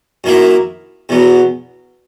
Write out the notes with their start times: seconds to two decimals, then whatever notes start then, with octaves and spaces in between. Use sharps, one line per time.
0.24 F#2 D#3 A#3 E4
1.09 E2 B2 F#3